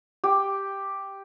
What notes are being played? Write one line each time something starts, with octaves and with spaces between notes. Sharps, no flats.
G4 G5